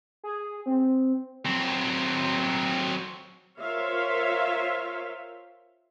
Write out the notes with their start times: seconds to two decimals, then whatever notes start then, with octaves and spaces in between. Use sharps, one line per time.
0.24 G#4
0.66 C4
1.45 F#3 C4
3.59 F4 A#4 C5 C#5 E5 F5